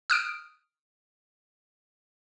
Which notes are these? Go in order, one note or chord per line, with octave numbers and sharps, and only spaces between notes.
D#6 F6 D7